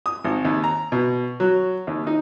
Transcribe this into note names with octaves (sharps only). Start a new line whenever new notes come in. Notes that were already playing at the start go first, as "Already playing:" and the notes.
D#6
G#1
D#2
A#5
B2
F#3
D#2
D#4